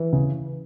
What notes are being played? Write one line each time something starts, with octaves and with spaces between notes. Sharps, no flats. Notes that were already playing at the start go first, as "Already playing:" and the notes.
Already playing: E3
C#3